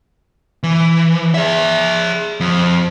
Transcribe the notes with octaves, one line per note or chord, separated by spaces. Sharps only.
E3
G#4 E5
F2